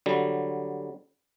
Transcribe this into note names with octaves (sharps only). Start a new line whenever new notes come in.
D3 F#3 G3